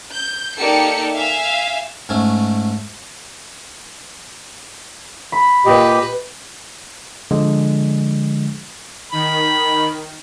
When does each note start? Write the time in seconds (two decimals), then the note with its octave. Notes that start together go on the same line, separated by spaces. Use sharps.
0.13 G6
0.58 A#3 D#4 G4 A4 D5 C#7
1.14 E5 F5 G#5
2.09 G#2 A3 C#4
5.32 B5
5.66 A#2 G4 B4 D#5
7.31 D3 F3 G#3
9.12 D#3 B5